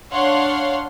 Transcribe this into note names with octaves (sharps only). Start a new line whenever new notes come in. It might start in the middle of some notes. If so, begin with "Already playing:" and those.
D4 C#5 F5 F#5 C6